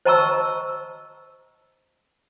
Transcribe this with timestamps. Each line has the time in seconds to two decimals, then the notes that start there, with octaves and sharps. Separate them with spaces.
0.05 C5 D#5 A5 A#5 C#6 E6